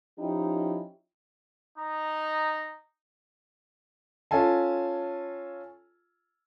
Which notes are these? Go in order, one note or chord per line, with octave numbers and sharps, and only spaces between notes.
F3 C#4 D#4 E4 G4
D#4 D#5 A#5
C#4 F4 A4 G#5 A5